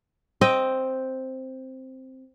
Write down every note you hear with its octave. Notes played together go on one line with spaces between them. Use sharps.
C4 D#5 G5